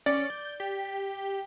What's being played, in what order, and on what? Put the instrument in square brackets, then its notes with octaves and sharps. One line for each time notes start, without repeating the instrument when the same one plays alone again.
[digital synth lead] C#4 [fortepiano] D5
[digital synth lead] G6
G4